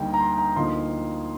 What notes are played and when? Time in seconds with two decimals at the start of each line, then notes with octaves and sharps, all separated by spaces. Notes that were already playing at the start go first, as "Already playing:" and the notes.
Already playing: D2 G3 A#3 D#4 G5
0.14 A#5
0.20 C6
0.38 A#5
0.56 D2 D3 F3 A#3 D#4 C6